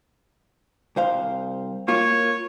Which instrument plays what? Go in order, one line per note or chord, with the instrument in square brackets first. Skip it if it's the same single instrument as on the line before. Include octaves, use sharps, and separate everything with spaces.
[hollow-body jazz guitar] C2 C5 F5
[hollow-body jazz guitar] A#3 F4 [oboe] C#5